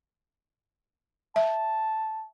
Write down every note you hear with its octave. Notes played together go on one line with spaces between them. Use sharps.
E5 A5